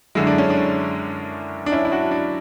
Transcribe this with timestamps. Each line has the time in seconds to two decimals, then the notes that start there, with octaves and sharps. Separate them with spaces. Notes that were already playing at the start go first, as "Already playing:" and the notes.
0.15 F#2 D3 G#3 E4
0.27 D4
0.38 C#4
0.50 D4
1.66 D4
1.72 C#4 E4
1.85 E4
1.92 D4 F#4
2.11 D4